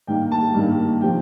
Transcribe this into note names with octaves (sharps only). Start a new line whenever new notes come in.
G2 D#3 A#3 G5
A5
G2 D#3 A#3
C3 F3 G5